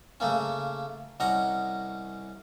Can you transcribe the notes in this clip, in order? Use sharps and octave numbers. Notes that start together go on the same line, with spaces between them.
C#3 A3 A#3 C#4
C2 C#4 D#5 F#5 A#5